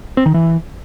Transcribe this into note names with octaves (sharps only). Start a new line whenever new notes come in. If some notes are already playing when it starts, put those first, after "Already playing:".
C4
D#3
E3